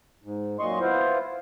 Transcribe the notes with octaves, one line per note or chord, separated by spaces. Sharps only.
G#2
F#2 A#2 D#5 C6 C#6
B3 E4 F4 C5